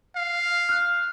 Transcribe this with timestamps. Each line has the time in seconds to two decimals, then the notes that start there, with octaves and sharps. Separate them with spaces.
0.16 F5
0.69 F6 F#6